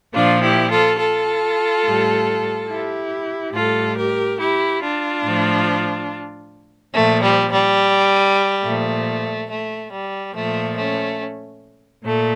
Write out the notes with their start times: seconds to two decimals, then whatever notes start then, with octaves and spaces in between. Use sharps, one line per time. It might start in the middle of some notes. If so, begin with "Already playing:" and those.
0.14 A#2 F3 D4 F4
0.42 E4 G4
0.71 F4 A4
1.00 F4 A4
1.84 A2 G3
2.70 E4 G4
3.54 A2 G3 F4 A4
3.97 G4 A#4
4.40 E4 G4
4.82 D4 F4
5.25 A2 F3
6.95 A#2 F3 A3
7.23 G3
7.52 G3
8.64 A#2 F3 A3
9.50 A3
9.92 G3
10.35 A#2 F3 A3
10.77 A3 C#4
12.04 A#2 A3